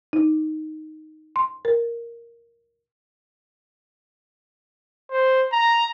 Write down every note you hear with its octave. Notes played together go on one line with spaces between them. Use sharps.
D#4
C6
A#4
C5
A#5